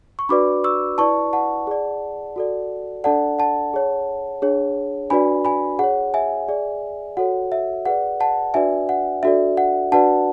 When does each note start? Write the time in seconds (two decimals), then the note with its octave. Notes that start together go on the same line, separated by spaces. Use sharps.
0.19 C#6
0.29 D4 F#4 B4 D5 B5 D6
0.64 C#6 E6
0.98 E4 B4 D5 A5 C#6
1.33 F#5 A5
1.67 G#4 D5
2.36 F#4 A4 D5
3.04 D4 A4 D5 F#5 A5
3.39 F#5 A5
3.74 G#4 C#5
4.42 D4 G#4 C#5
5.10 D4 F#4 B4 D5 G#5 B5
5.45 G#5 B5
5.79 G#4 C#5 F#5
6.14 E5 G#5
6.48 G#4 D5
7.17 F#4 A4 C#5 F#5
7.52 E5
7.85 G#4 B4 D5 F#5
8.20 F#5 A5
8.54 D4 F#4 B4 D5 E5 G#5
8.89 F#5
9.23 D4 F#4 A4 D5 E5
9.57 F#5
9.92 D4 F#4 B4 D5 F#5 A5